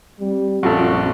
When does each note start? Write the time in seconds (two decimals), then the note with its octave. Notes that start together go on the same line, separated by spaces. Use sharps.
0.20 G3 C4
0.63 A#1 F#2 F4 F#4 A4